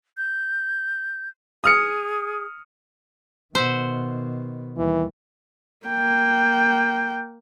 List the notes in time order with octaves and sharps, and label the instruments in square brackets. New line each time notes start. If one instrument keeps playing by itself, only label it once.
[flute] G6
[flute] G#4 [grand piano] D#6 F6 C#7
[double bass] B2 D#3 [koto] C5 E5 F#5
[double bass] D#2 G3 [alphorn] E3
[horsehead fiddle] A#3 G5